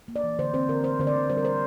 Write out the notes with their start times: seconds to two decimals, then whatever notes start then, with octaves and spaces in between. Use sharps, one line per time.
0.08 A#3
0.16 D5
0.24 E3
0.39 D3 C5
0.54 C4 C5
0.68 D3 A#4
0.84 A3 C5
1.00 D3 C5
1.07 D5
1.15 D3
1.30 G3 C5
1.37 A#4
1.45 C4 C5